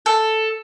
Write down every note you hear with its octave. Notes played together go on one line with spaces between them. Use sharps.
A4